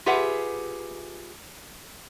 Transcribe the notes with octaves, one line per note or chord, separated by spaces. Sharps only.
F4 G4 G#4 B4 E5 F#5